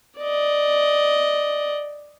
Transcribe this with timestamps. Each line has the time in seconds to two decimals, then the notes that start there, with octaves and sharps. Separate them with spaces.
0.19 D5 D#5